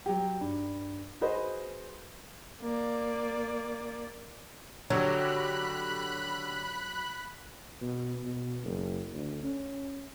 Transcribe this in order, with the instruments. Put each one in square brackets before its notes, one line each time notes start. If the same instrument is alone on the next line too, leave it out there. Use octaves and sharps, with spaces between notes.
[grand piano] F#3 G4
G2
F#4 G#4 B4 C5 D#5
[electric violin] A#3 D5
[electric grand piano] D3 F#4 G4 [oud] F#3 [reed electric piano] C#5 [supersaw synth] B5 F#6
[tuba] B2
B2
F#1
D2
C#4